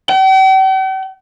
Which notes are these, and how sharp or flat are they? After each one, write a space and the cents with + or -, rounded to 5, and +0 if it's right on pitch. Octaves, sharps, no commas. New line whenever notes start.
G5 -45